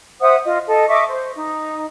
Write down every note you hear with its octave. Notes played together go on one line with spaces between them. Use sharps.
C5 E5 F#5 D#6
F4 D#5
A4 D#5
D#5 E5 C#6 D6
C5
D#4